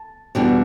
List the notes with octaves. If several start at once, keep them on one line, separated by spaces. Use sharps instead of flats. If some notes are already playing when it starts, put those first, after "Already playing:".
Already playing: A5
E2 B2 G3 D4